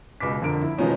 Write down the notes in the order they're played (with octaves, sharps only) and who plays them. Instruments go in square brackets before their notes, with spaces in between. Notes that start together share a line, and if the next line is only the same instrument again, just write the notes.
[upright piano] C#2 B2 D6 B6
F2 D3 A#4 D7
E4
B2 D#3 F3 G#3 C#4 D#4